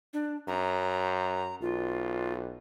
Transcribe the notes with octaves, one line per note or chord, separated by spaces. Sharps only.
D4
F#2 A#5
B1 F4